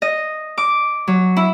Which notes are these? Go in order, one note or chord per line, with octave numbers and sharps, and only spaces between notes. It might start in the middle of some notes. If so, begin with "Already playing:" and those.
D#5
D6
F#3
E4